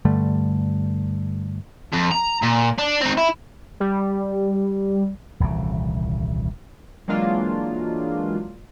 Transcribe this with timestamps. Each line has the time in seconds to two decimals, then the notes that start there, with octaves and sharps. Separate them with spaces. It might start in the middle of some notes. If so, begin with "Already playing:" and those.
0.05 G2 D3 G3 A3
1.92 F2
2.11 A#5
2.42 A#2
2.78 D4
3.01 C4 D#4
3.18 E4
3.80 G3
5.40 D#1 C2 C#3 E3
7.08 E3 F#3 G#3 A#3 D4 F4